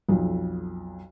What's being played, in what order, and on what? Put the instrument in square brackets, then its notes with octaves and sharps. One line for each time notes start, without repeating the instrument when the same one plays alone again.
[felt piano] B1 F2